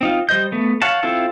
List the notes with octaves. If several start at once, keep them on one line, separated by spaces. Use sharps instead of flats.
C4 D#4 F4
G3 C5 D#5 G6
A3 B3
C#5 F5 F#5 A5
C4 E4 F4 A4 E5